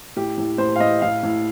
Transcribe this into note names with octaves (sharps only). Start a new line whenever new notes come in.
A2 G4
A2
A2 C5
F5
A2 D#5
A2 F5
A2